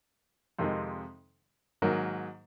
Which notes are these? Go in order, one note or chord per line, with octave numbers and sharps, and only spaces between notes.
F2 C3 D#3 G#3
G#2 D#3 F#3 A#3